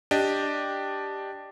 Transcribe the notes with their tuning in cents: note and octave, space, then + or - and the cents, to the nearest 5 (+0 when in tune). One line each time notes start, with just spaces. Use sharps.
D4 +0 G4 +0 D#5 +0